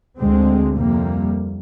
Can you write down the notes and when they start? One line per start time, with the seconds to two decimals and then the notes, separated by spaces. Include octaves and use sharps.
0.18 D2 D3 G#3 C4
0.77 F2 C3 G3 A#3